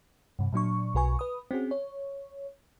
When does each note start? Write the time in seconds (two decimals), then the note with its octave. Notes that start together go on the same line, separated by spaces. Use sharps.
0.39 G2 C3
0.53 A#2 F#3 D4 C#6
0.94 B1 B2 F#4 B4 G#5 C#6
1.19 B4 D#6
1.51 C4 C#4 F#4 G#4
1.71 C#5